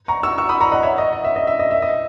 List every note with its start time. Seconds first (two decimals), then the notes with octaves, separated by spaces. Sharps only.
0.08 A#5 C#6
0.23 C#6 E6
0.38 C#6 E6
0.49 B5 D#6
0.60 A#5 C#6
0.72 D#5 F#5
0.83 C#5 E5
0.98 D#5
1.13 D#5
1.24 E5
1.36 D#5
1.47 E5
1.59 D#5
1.71 E5
1.82 D#5